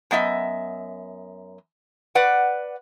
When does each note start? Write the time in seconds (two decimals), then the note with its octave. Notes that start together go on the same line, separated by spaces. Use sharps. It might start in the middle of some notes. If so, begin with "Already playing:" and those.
0.11 F#2 B3 D#5 E5
2.15 B4 D5 F#5